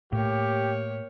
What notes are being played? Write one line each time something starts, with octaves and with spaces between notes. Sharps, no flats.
A2 A#3 G4 C#5